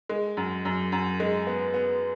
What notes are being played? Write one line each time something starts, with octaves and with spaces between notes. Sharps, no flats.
G#3
F#2
F#2
F#2
G#3
B3
B3